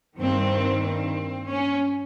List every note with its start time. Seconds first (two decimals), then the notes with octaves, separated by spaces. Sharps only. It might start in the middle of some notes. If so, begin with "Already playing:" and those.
0.19 G2 D#3 G3 C4
0.83 C4
1.47 C#4